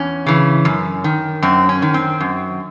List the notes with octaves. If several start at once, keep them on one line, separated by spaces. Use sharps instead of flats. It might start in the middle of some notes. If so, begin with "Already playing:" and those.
Already playing: E2 C#4
C#3 E3
F#2
D#3
F#2 C4
C#4
D#3
C4
F#2